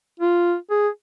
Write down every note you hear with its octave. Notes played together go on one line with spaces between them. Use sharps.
F4
G#4